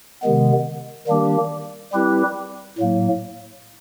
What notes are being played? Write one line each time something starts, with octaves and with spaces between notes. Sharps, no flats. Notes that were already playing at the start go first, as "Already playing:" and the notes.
C3 D#3 G#3 B3
D#3 G3 A#3 D4 G4
G3 C4 E4 G4 B4
A2 F#3 A#3